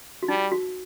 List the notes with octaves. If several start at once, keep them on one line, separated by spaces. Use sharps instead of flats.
F#4
G3 D#4
F#4